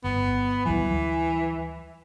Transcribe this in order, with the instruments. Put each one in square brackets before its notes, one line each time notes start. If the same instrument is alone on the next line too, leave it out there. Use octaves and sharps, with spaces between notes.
[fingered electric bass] G1 [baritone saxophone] B3
[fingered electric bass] D2 F#3 G3 [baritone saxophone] E3